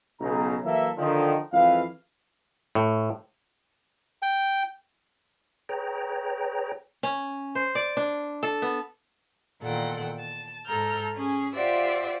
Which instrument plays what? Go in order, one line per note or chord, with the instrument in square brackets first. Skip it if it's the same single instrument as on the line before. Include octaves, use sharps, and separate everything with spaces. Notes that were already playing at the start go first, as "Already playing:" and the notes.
[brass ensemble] B1 C#3 A#5
E3 F#3 A#3 A4 E5
D3 D#3 F3
F2 E3 G#3 B4 F5
[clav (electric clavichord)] A2
[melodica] G5
[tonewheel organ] G#4 B4 C#5 G5 A#5
[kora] C#4
C5
D5
D4
A4
B3
[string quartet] E2 A#2 D#3 A4 F#5 G5
A5
G#2 A4 A#5 F6 G6
C#4 G#4
F4 G4 C5 D5 E5 F#5